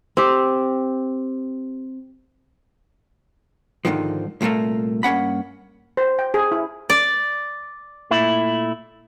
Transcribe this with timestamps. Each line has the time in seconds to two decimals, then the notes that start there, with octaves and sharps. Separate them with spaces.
0.17 C4 G4
3.85 G#2 B2 D3 D#3 F3
4.41 C2 A#2 D#3 A3 A#3
5.03 G2 A#3 C#4 F#5 B5
5.97 C5
6.19 G5
6.34 G#4
6.52 E4
6.90 D5
8.11 A#2 A3 E4